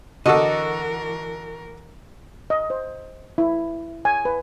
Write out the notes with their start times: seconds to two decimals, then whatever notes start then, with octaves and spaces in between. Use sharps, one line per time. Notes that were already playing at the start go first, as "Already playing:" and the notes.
0.26 D3 E3 F#4 A4 A#4 D#5
2.50 D#5
2.70 C5
3.38 E4
4.05 G#5
4.25 B4